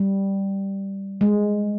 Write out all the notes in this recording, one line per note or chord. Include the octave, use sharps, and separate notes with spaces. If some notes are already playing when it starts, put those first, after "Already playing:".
Already playing: G3
G#3